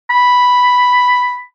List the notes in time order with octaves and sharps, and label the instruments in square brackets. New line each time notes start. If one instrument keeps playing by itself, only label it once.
[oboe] B5